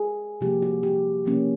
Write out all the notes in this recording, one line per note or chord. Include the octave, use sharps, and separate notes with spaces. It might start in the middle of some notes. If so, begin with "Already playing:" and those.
Already playing: G#4
C3 F3 A#3 G4
F#4
G4
C3 F3 A#3 C#4